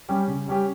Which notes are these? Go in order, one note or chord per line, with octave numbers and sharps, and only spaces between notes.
G3 C#4 G4
C#3
G3 C#4 G4